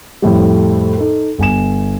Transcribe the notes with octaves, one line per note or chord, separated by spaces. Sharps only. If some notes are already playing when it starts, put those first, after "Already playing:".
F2 A2 G3
D#4 A4
G1 G#5 E7